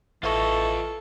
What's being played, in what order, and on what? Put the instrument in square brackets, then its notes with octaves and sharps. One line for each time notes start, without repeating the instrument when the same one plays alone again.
[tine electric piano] A1 C#6 [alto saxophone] E3 [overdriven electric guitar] F4 D#5 [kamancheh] A4